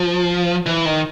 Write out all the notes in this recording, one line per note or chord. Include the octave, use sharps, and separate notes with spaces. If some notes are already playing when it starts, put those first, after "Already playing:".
Already playing: F3
E3
D#3